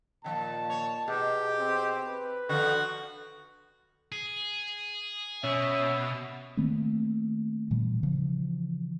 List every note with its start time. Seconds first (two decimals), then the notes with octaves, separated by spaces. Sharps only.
0.24 A#2 D#3 F3 A5
0.70 C#5
1.08 B2 D#4 G4 G#4
1.59 C4
2.07 B4
2.49 D3 F3 F#4 A4
4.12 G#4
5.44 B2 C#4 E5
6.57 D#3 A3 A#3 C4
7.71 A#2 E3 G3
8.03 C#3 E3 F3